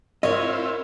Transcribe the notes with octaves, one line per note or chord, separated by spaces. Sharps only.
C4 E4 F4 A#4 C#5 D#5